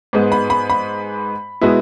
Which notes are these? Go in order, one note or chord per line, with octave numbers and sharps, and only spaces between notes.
G#2 G#3 B3
B5
B5
B5
B2 G#3 B3 E4